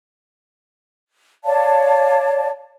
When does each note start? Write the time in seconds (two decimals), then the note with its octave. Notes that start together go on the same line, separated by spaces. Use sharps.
1.44 C#5 D5 F5 A5